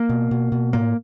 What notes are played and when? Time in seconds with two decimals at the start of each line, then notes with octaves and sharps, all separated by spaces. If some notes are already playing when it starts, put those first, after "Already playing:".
Already playing: A#3
0.09 B2
0.31 B2
0.52 B2
0.73 A2 A#3